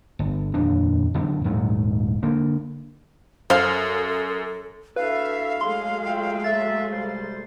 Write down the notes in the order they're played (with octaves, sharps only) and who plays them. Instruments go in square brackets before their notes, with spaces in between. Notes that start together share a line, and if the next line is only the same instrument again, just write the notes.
[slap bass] G1
D#1 F2 D4
F#2 D3 C4
D#1 G#2 F#3 A3
D3 A#3
[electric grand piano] F#2 [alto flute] A4 [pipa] C5 F5
[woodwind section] D4 E4 F#4 [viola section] A4 E5 [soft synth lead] B4 [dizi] F5
[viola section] F#3 G#3 A3 [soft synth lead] C6
[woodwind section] F4 E5 G5
[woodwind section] E5 [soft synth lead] A6
[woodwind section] C3 G3 C5